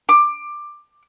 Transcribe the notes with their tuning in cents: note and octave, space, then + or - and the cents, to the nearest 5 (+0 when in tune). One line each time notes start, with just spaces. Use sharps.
D6 +15